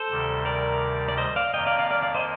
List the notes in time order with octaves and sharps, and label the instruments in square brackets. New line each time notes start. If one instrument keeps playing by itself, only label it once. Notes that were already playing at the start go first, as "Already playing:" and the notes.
Already playing: [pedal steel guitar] A4 C5
[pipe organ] D2 C3 D#3 G3
[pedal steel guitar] A#4 D5
D5
C5 D#5
D5 F5
[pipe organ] F2 D#3 A#3 [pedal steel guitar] D#5 G5
[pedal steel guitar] D5 F5
D5 F5
D5 F5
D5 F5
C5 D#5